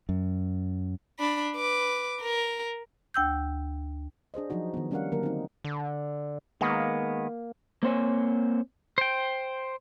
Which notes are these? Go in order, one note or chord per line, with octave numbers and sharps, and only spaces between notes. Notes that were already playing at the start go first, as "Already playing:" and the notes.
F#2
D4 B5
B4 D6
A#4
D2 G5 E6 G6
D4 G#4 C5 D#5
F3 F#3 D#4 F#4
D#3 B3
G3 C#4 D4 A#4 F5 F#5
D3 F#3 A#3 A#4
C4 D#4
D3
D#3 G#3 A#3 B3
A#3 C4 C5 C#5 G#5
C5 G5